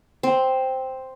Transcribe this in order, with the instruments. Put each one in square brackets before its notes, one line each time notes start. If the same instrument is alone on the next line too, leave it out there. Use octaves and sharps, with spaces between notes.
[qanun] C4